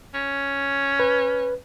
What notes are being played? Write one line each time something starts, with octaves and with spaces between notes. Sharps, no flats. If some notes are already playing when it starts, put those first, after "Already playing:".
C#4
B4